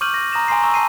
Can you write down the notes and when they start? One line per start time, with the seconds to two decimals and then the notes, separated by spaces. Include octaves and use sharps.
0.01 C#6 D6 F6 G6 D#7 F#7
0.14 A#6
0.33 A#5 D#6 A#6 E7
0.48 G#5 A#5 C6 C7
0.61 A#5 C#6 E6
0.74 A5 C7 D#7